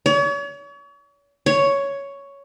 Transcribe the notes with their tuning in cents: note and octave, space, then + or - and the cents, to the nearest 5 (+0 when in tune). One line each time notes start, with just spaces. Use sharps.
C#5 +40
C#5 +5